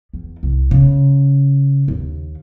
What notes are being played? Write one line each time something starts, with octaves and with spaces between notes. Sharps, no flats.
E2
C2
C#3
D#2